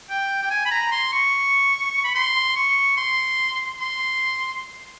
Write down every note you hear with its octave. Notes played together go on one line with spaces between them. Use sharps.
G5
G5
G#5
B5
A#5
C6
C#6
B5
C6
C#6
C6
C6